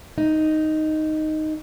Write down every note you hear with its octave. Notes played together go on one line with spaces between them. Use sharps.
D#4